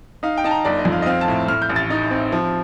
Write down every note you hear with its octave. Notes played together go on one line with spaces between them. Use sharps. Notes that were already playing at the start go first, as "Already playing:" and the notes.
D#4 F5
G5
D#4 A5
A#5
G1 D5
D#5
F2
F5
D#5
C4 F5
A5
A2
A2 F6
G6
A1
A6
D#4
C4
F3